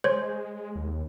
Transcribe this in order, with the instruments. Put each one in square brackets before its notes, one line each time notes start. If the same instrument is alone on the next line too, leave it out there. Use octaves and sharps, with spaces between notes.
[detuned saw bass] G#3 [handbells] C5 C#5
[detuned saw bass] D#2